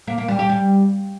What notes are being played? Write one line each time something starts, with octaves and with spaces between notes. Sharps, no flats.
A#3
A#3
G3
G4
G3